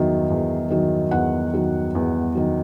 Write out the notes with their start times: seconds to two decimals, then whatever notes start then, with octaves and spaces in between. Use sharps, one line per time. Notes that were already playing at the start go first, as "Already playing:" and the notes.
Already playing: E2 D#3 F#3 E5
0.30 E2
0.70 D#3 F#3
1.11 E2 F#5
1.53 D#3 F#3
1.95 E2
2.35 D#3 F#3